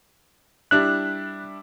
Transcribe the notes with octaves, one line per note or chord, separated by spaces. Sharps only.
G3 D4 E4 F#6